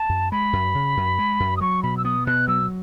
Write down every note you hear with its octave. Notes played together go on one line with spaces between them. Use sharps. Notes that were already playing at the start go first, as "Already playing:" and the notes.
Already playing: A5
F#2
G#3 B5
F#2
C#3
F#2
G#3
F#2
D#6
F#3 C#6
B2 B5
E6
B3 D#6
B2 F#6
F#3 E6